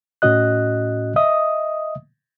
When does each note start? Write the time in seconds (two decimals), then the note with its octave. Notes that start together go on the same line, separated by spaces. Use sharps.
0.22 A2 C#4 F#4 D#5 F#6
1.16 D#5 E5 D#6